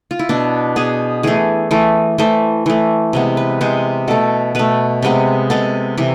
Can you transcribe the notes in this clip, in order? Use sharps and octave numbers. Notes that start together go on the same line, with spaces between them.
F4
E4
B2 B3 D4
B2 B3 G#4
E3 A3 G#4
E3 A3
E3 A3 C5
E3 A3
C3 G#3 B3
B4
C3 G#3 B3 C5
B2 A3 A4
B2 A3 B4
C3 G#3 B3
C3 G#3 B3 A4
C3 E3